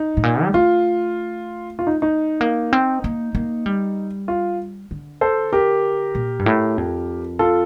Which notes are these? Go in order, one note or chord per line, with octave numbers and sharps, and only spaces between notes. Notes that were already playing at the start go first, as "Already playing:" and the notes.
Already playing: D#4
A2
A#2
G3
A3 F4
F4
D#4
D#4
A#3
C4
A#3
A#3
G3
F4
D3
A4 C5
G4 A#4
A#2
G2
A2
F2
F4 A4